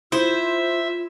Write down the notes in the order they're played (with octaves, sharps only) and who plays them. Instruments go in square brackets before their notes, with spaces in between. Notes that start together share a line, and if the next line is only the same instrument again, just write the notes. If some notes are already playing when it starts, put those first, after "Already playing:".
[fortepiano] E4 [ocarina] F4 [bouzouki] C5 [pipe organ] E5